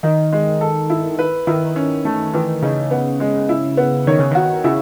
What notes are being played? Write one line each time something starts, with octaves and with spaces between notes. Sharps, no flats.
D#3 D#4
G#3
A4
E4
B4
D#3 E4
C#4
A3
D#3 E3
C#3 D#4
B3
G#3
E4
B3
D#3 C#5
C#3
D#3 F#4
C#3 E4